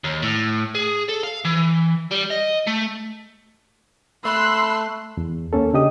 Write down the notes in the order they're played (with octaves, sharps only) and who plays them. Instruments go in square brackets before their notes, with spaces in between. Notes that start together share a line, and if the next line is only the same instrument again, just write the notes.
[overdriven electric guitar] D#2
A2
G#4
A4
F5
E3
G3
D#5
A3
[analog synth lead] A3 [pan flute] B5 [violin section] C6 F#6 [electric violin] E6
[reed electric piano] E2
D#2 A#3 C#4 A4
C#3 D4 G4 D#5 D#6